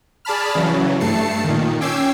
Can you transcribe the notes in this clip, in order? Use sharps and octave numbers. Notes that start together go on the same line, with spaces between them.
G#4 D5 A5 B5 F6
C#3 E3 F#3
G2 A3 A5 C7 C#7
A#2 D#3
C#4 G5 D6 E6 G#6 C7